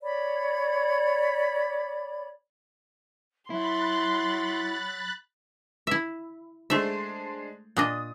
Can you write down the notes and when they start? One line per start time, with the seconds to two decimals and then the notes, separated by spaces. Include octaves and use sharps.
0.02 C#5 D5 B5
3.50 F#3 E4 B5 C6 F#6 A6
5.87 E4 E5
6.70 G#3 A3 D4 C5 E5
7.77 A#2 D4 D#5 D#6